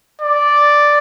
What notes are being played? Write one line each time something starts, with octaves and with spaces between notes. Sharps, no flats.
D5